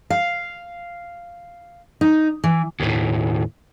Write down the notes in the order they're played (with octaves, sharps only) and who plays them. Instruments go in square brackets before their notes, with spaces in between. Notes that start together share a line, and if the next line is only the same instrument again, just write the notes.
[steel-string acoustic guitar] F5
D#4
E3
[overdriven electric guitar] D#2 A2